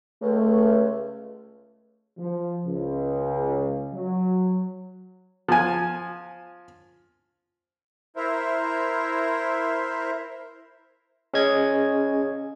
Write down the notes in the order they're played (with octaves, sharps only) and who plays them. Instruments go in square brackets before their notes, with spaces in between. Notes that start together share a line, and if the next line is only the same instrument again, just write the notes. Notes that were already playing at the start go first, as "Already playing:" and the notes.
[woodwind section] C#2 [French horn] A3
[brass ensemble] F3
C#2
F#3
[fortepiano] F3 G#5
[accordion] E4 A#4 C5 E5
[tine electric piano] C#4 G#4 D#5 G#6